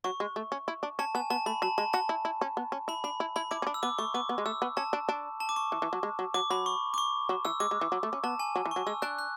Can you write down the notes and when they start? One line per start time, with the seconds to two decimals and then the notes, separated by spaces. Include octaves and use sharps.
0.04 F#3 C#6
0.20 G#3
0.36 A3
0.52 C#4
0.68 E4
0.83 D4
0.99 C#4 A5
1.15 B3 G#5
1.30 B3 A5
1.46 A3 B5
1.62 F#3 A5
1.78 G#3 A5
1.93 F#4 A5
2.09 E4
2.25 E4
2.41 C#4
2.57 B3
2.72 C#4
2.88 E4 B5
3.04 D4 B5
3.20 E4
3.36 E4 B5
3.51 E4 D6
3.62 C#4
3.67 D4
3.74 E6
3.83 B3 D6
3.98 A3 C#6
4.14 B3 D6
4.29 B3
4.38 G#3
4.46 A3 E6
4.62 B3
4.77 C#4 A5
4.93 D4
5.09 D4
5.40 A5
5.49 D6
5.56 C#6
5.72 E3
5.82 E3
5.93 F#3
6.03 G#3
6.19 F#3
6.34 F#3 D6
6.50 F#3 B5
6.66 C#6
6.94 D6
6.98 C#6
7.29 F#3
7.45 E3 E6
7.60 G#3 D6
7.71 G#3
7.81 E3
7.92 F#3
8.03 A3
8.13 C#4
8.24 B3 A5
8.40 G#5
8.56 F#3
8.66 E3
8.71 F#3 C#6
8.87 G#3 E6
9.02 D4 F#6
9.19 F#6